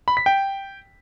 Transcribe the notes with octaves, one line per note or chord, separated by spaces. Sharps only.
B5
B6
G5